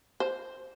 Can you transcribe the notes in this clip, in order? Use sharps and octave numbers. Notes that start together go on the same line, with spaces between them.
C5